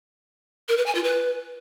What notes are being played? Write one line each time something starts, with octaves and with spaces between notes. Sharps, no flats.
A#4
B4
G#5
F4
B4